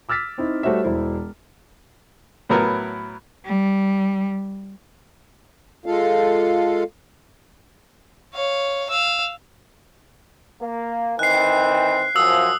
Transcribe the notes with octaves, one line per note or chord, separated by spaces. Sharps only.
D6 E6 F6 A6 B6
C4 D#4 E4
G3 A3 F#4 C5 C#5 E5
E1 E4 C5
A2 F#3 B3 A#4 B4
G3
G#3 F4 A4 F5
C#5 F5
F5 E6
A#3
D#3 E3 C4 F#6 C7
F#2 F3 D#6 E6